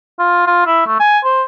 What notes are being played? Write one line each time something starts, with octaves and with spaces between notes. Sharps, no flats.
F4
F4
E4
A3
G#5
C5